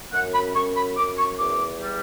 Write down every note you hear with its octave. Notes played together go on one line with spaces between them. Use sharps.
F#2 F#5
B5
F#2 C#6
B5
F#2 D6
C#6
E2 D6
G3